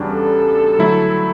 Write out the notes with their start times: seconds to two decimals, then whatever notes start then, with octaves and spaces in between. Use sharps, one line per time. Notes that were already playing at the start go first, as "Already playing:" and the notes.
Already playing: E2 C#3 G3 D4 F#4
0.11 A4
0.79 D3 F#3 A3 E4